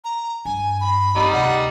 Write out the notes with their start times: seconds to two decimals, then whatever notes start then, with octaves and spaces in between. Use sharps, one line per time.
0.04 A#5
0.45 G2 G#5
0.81 B5
1.16 G3 C4 D#4
1.33 D2 C3 F#5